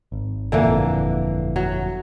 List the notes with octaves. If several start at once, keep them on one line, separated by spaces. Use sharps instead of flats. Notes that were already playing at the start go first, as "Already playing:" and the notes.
G#1
G1 F2 A#2 D3 E3 A#3
F#3